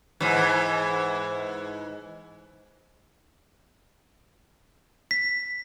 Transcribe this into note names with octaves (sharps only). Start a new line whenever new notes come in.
G#2 E3
B6